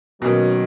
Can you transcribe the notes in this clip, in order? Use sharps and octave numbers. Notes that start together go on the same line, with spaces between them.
B2 D#3 F#3 A#3 C#4